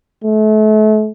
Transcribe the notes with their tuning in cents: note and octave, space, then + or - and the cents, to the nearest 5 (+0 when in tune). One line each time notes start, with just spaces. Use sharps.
A3 -35